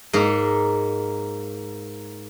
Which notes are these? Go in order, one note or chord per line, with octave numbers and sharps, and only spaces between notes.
G#2 A#3 D#4